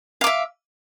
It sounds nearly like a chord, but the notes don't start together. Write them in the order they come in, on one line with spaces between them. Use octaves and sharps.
F5 D6 E5